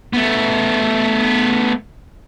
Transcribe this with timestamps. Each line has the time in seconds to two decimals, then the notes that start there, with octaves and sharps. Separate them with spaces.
0.13 A3 B3